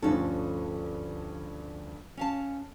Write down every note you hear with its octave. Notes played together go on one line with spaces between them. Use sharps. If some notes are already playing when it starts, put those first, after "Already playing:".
D2 G2 F3 C#4 A4
C#4 F5 A5